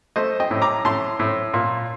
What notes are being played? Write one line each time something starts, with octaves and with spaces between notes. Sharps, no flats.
A3 C5 D#5
D#5 G5
A2
A#5 D6
A2 A5 C6
A2
A#2